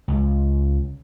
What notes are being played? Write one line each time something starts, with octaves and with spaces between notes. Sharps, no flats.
C#2